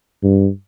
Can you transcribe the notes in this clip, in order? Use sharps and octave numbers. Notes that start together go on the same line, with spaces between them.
G2